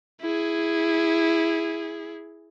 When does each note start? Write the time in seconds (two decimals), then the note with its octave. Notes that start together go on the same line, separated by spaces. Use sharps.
0.21 E4 G#4